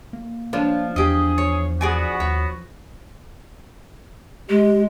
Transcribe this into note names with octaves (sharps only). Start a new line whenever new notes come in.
A#3
F3 D4 F4
E2 G4 G#4 D#5
C#5
B3 F#4 G#4 D5 G#5
D#2 C#5 C#6
G#3 G4